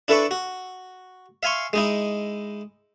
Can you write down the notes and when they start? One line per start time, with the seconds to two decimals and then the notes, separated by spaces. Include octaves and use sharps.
0.08 D4 E4 A4 B4 E5 C#6
0.31 F#4
1.43 E5 F5 G#5 C6 C#6
1.73 G#3 D#4 E4